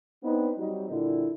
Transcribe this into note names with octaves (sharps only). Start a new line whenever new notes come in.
B3 C4 D4 D#4 B4
F#3 G3 C4 D#4
A#2 D3 G3 E4